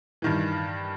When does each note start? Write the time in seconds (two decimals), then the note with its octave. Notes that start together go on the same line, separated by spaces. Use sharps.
0.22 G2 D#3 E3